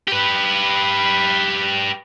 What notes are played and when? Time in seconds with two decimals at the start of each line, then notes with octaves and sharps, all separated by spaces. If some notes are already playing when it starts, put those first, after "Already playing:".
0.08 G4 B4